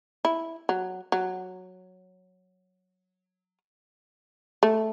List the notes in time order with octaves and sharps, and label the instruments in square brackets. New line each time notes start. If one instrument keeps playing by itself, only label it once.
[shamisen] E4
F#3
F#3
A3